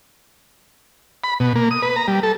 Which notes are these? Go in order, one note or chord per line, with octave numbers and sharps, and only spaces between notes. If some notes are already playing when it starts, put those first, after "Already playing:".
B5
B2
A#3
D#6
B4
A#5
G3
A4